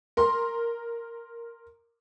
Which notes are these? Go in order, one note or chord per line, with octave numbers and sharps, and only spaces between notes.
A#4 C6